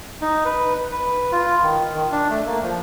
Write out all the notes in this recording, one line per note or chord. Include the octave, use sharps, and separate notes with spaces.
D#4
B4
B4
F4
D#3
D#3
D4
A3
A#3
F3